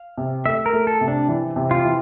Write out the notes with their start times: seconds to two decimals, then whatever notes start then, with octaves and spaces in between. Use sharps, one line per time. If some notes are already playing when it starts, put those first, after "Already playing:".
Already playing: F5
0.18 C3
0.46 A3 E5
0.66 A#4
0.73 A3
0.87 A4
1.01 C3
1.08 D4
1.29 E3
1.56 C3
1.71 F4
1.84 E3